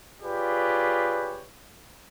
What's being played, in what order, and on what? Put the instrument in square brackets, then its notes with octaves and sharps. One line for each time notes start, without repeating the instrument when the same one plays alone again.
[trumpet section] F4 G4 G#4 B4 C#5 D5